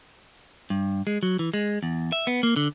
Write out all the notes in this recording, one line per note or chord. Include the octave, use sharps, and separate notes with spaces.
G2
G#3
F#3
E3
G#3
E2
E5
B3
A#3
D3